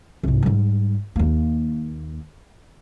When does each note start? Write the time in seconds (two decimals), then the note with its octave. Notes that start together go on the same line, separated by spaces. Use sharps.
0.23 C2 G#2
0.43 G#2 G3
1.16 D#2 A#3